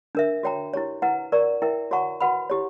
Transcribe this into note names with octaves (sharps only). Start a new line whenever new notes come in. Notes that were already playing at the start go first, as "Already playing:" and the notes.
D4 A#4 E5
F#4 C#5 G5 A#5
E4 G4 C#5
E4 B4 F#5 A#5
A#4 D5 A#5 C#6
E4 A#4 E5 G5
F#4 C#5 F#5 A#5 C#6
F#4 B4 F#5 B5
E4 G4 C#5